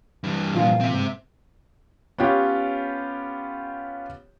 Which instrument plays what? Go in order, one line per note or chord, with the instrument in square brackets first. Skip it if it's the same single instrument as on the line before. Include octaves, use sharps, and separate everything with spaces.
[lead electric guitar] G2 E3
[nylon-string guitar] A#2 F3 F4
[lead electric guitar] C4 E5
[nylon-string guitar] G#2
[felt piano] B3 C#4 F4 G4 C#5